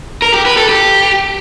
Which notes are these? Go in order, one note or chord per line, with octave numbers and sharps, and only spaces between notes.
A#4
G4
B4
A4
G4